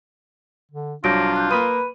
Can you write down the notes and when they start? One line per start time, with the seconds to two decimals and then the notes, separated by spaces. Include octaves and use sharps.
0.72 D3
1.04 C2 F#3 D4 F4 G6 A#6 D7
1.36 F#6 G6
1.51 A#3 B4 B5 D#6 D#7